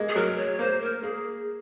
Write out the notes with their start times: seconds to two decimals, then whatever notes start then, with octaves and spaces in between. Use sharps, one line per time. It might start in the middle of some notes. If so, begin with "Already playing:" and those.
Already playing: G#3 A#3
0.09 G#4
0.15 F#3 A#4
0.37 C#5
0.59 A#3 C5
0.81 A#4
1.03 A#3 G#4